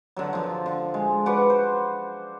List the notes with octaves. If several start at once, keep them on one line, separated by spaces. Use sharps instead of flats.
D3 F#3
D3 F3
D3
G#3
F#4 B4 D5 F#5
C5